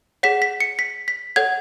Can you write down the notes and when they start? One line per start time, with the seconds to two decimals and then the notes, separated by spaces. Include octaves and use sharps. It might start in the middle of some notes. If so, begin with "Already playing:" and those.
0.23 G#4 C#5 F#5 B6
0.42 B6
0.60 C#7
0.79 B6
1.08 B6
1.36 A4 C#5 F#5 G#6